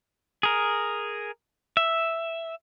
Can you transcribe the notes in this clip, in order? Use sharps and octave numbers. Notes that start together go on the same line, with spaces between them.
G#4 A#4
E5